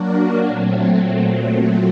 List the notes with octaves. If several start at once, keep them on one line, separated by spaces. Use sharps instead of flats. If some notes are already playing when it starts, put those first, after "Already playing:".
Already playing: F#3 A#3 D4 F#4 A#4
A#2 F#3 A3 C4